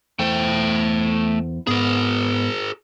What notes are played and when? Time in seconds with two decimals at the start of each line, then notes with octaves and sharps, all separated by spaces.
0.19 E2 A3 A4 C5 G5
1.67 G#2 B3 G#4 A#4